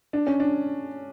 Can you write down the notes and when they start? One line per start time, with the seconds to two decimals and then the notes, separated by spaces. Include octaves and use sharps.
0.13 D4
0.27 C#4
0.40 D4